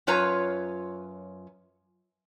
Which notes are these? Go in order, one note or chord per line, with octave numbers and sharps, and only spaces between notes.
F#2 F4 B4 C#5 A#5